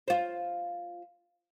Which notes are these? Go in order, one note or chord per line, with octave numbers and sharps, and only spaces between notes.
F4 C5